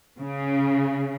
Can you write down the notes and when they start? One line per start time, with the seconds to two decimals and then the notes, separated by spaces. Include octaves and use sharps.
0.19 C#3